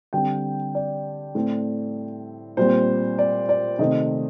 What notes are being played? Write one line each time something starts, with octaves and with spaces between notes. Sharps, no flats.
D3 G3 C4 G5
D5
A2 A3 C4
A#2 G3 C4 C5
D5
D5
C3 D#3 A3 C4 D#5